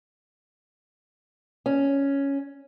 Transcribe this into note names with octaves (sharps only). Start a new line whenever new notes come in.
C#4